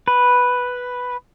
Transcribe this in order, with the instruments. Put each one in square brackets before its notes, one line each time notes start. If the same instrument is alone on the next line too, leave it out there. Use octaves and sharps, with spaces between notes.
[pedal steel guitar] B4